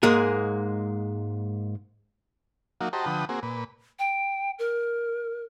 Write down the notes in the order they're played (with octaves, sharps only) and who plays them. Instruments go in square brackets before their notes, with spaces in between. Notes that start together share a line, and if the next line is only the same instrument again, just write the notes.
[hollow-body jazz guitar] G#2 G#3 A#3 G#4
[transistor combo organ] F#3 A#3 D#4 F#4 F5
F#4 G4 C5 D#5 A5 A#5
D3 F3 B4 F#5 G5 D#6
A#3 C4 F#4 G#4
A#2 B4
[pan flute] G5
A#4